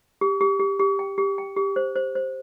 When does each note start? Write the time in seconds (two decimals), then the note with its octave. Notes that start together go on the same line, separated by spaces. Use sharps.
0.21 G4
0.41 G4
0.60 G4
0.79 G4
0.99 G5
1.18 G4
1.38 G5
1.56 G4
1.76 C5
1.96 C5
2.15 C5